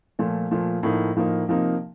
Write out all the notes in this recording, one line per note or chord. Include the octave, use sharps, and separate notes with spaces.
A#2 F3 A3
A#2 F3 A3
A2 F3 A#3 D#4
A2 F3 A#3 D#4
C3 F3 A#3 D#4